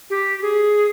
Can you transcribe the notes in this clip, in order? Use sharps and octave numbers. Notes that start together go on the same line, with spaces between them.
G4
G#4